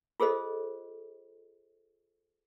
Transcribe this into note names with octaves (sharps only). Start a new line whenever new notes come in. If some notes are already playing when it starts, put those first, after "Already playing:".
F4 G#4 A4 C5 D#5